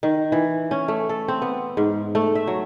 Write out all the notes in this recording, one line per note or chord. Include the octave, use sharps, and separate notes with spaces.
D#3
E3
C#4
A3
A4
C4
B3
G#2
A3
E5
F#3